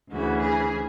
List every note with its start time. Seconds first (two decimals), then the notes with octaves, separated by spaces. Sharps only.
0.11 D2 C#3 E3 F#4
0.40 G#4